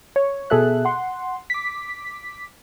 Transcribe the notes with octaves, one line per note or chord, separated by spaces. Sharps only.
C#5
B2 G#4 A4 E5 F#6
F#5 C6
D6 B6